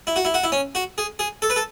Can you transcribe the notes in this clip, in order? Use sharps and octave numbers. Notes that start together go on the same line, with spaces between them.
E4
F#4
E4
F#4
E4
C#4
F#4
G#4
G#4
A4
B4
A4